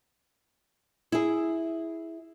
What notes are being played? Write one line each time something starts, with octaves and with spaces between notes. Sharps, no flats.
E4 G#4